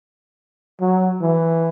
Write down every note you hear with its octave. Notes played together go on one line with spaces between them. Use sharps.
F#3
E3